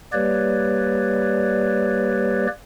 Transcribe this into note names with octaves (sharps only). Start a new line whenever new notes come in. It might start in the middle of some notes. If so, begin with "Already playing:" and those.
G3 A#3 G4 B4 C#5 D5